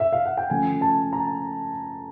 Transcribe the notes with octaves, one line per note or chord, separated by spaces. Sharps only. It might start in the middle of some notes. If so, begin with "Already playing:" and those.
E5
F5
F#5
G5
C#3 F3 A3 G#5
A5
A#5